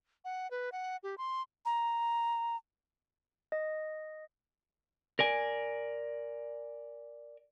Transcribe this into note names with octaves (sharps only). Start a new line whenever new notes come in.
F#5
B4
F#5
G4
C6
A#5
D#5
A#4 D5 G#5